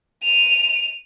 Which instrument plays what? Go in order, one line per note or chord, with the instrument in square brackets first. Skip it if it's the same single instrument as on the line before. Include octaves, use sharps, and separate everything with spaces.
[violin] D#7 F7